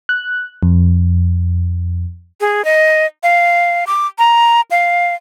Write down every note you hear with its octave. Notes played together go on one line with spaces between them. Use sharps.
F#6
F2
G#4
D#5
F5
D6
A#5
F5